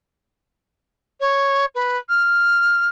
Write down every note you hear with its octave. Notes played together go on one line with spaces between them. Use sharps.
C#5
B4
F6